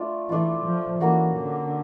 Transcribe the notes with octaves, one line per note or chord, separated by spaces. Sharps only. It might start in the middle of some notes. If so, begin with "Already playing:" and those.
Already playing: A3 D4 F4
E3 A3 D4 F4
F3
E3 A#3 C#4 F#4 A4
D3